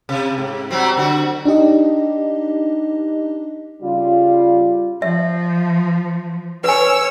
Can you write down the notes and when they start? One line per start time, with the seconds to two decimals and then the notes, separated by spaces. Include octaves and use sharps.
0.09 C3
0.38 G#2
0.70 F#3 G3 C4
0.97 D3 F#4
1.45 D4 D#4 G4 D#5
3.83 C#3 G3 F4
5.02 F3 E5
6.64 B4 C#5 G#5 E6